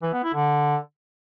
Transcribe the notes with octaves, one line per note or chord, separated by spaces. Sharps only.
E3
B3
E4
D3